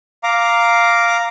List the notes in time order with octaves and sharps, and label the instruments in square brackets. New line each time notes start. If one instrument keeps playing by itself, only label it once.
[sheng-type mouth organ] F5 A#5 D6